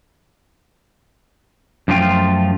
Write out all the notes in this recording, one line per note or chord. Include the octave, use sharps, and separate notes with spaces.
F#2 F3 A3 F4 G5